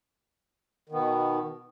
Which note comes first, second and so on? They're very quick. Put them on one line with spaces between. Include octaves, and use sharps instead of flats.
D#3 B3 B2